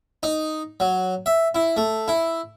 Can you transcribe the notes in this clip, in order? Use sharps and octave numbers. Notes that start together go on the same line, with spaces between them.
D#4
F#3
E5
E4
A3
E4